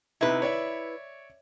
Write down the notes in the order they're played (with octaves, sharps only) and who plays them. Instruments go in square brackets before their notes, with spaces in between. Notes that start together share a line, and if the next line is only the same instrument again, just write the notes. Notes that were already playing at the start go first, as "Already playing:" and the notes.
[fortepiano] C3 D#4 [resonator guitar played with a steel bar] E4 B4
[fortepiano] C#5 D5 E5